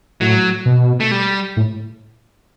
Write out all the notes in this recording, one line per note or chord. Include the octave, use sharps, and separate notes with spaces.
A2 F#3
B2
A3
G3
A2